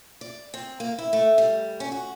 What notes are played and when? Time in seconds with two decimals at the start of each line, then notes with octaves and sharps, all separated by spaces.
0.21 D5
0.54 C4
0.80 A#3
0.98 E4
1.13 A3
1.38 G3
1.80 C#4
1.92 F#4